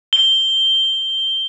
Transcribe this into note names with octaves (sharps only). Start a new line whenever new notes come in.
G7